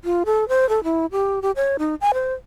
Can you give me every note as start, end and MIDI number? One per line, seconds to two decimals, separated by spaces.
0.04 0.23 65
0.26 0.48 69
0.49 0.68 72
0.69 0.83 69
0.84 1.06 64
1.12 1.42 67
1.42 1.51 67
1.56 1.77 73
1.79 1.95 63
2.01 2.12 80
2.14 2.33 72